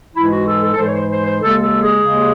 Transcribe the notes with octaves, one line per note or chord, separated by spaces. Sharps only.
G#2 E3 G#3 E4
F#4
A4
A4
A4
G#2 E3 G#3 C5
C#5
C5
C5
C5
D#2 C#3 G#3 A4
A4
G#4
D#2 C#3 G#3